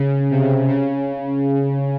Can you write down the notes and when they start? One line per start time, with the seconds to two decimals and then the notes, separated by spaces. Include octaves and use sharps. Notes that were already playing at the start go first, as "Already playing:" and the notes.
Already playing: C#3
0.31 C3
0.69 C#3